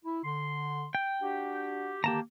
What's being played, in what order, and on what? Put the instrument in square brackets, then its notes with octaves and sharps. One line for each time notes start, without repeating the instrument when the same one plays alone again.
[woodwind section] E4
D3 C6
[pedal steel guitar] G5
[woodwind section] D4 F#4 G4
[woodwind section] D3 D#3 A#3 [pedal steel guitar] G4 A5 A#5